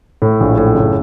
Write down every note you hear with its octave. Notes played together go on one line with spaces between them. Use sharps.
A2
A#1
A2
F#1